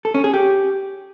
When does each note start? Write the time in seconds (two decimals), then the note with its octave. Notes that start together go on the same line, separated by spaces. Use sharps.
0.05 A4
0.14 C#4
0.24 G#4
0.34 G4